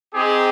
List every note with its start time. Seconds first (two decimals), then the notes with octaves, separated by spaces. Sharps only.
0.13 C4 D#4 G4 G#4